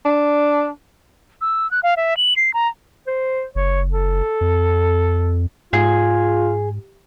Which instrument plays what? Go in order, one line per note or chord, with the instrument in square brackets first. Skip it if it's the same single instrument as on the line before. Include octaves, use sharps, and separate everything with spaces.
[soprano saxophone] D4
[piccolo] E6
F#6
F5
E5
F#7
C7
A#5
[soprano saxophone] C5
[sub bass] F#1 [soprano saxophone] C#5
[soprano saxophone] A4
[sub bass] F2
[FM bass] G#2 [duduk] F4 [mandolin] G#4